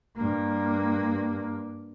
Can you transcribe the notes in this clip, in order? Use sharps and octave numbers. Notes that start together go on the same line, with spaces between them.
G2 A#3